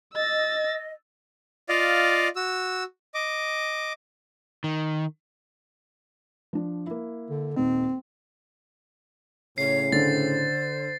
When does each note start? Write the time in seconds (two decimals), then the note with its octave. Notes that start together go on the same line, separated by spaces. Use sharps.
0.14 D#5 E6 A6
1.69 F4 D5 D#5 F5
2.36 F#4 E6
3.14 D#5 D6
4.64 D#3
6.53 F3 D4
6.87 A#3 E4
7.30 D3
7.56 D#1 C4 D#4
9.58 A2 C#3 C#5 C7
9.92 D3 C5 A6